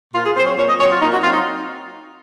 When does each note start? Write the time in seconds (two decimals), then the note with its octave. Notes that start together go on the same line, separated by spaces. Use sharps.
0.13 A#2 F4
0.25 G#4
0.36 C4 C5
0.39 F#3
0.46 C#5
0.57 A#2 C#5
0.68 D#5
0.79 F#3 C#5
0.82 C4
0.90 F4
1.01 A#2 D#4
1.12 F#4
1.22 F#3 C4 F4
1.33 D#4